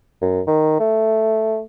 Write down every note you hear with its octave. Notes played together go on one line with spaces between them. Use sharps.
F#2
D#3
A3